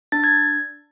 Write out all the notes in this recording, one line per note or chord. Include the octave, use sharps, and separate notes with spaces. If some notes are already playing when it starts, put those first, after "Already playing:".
D4 A6
G#6